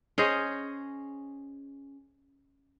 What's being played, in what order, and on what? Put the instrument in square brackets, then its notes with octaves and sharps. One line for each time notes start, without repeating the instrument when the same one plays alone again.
[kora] C#4 G#4 C5 D#5